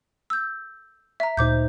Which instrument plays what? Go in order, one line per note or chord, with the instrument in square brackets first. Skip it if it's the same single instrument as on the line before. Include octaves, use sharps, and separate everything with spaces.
[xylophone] E6 G6
E5 A#5
[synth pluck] D2 A#2 D#4 [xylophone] C5 D6 G6